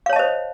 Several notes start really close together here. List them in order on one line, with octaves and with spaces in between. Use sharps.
F5 C#5 A5 D#5 C5